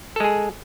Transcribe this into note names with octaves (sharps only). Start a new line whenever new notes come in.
G#3 G#4 A4